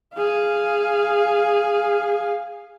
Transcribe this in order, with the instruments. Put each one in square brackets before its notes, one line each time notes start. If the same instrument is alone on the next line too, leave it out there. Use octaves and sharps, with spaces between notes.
[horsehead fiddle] G#4 F5